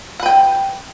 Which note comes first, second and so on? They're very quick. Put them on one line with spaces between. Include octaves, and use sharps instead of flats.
F#5 B4 G5